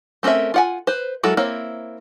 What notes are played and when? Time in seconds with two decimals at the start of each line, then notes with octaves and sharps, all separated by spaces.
0.23 A3 C4 C#4 A#4 E5
0.54 F4 F#5 G#5
0.87 B4 C5
1.23 F#3 G#3 E4 A4 A#4
1.37 A#3 C4 E4 C#5